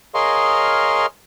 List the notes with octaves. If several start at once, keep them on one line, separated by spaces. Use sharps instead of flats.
G#4 A#4 C#5 D#5 F5 C6